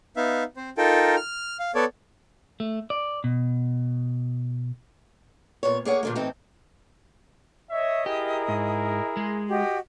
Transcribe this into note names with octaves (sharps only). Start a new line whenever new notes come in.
B3 D#4 E5 F5
C4 C5
D#4 F4 A4 A#4 G5
F6
F5
B3 A4 C#5 D5
A3
D5
B2
A#2 B3 C#5
A#3 G#4 C#5 F#5
A#2 D3 A#3
A2 E3 C4 D#4
C#5 D#5 E5
E4 G4 G#4 A#4
G#2
G#3
F#4 G4 D#5